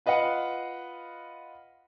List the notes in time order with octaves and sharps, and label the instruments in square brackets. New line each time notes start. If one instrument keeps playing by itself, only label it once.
[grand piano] F4 B4 D#5 F5 F#5